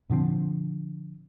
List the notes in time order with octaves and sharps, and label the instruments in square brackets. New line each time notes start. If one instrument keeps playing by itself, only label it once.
[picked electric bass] A#2 D3 F3 C4